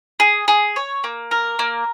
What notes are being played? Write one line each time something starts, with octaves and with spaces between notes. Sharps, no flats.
G#4
G#4
C#5
A#3
A#4
A#3